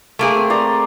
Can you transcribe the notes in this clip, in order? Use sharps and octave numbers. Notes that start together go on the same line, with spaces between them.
A3 A#3 G#4
C4
D5 A#5 C6